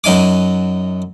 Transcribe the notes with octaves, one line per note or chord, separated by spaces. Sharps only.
F#2 F#3 D#4 G#5 D6